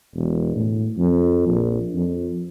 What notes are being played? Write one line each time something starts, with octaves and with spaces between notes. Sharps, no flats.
E1
A2
F2
A#1
F2